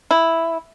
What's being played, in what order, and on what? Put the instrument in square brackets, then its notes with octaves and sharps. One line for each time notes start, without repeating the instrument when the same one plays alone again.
[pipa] E4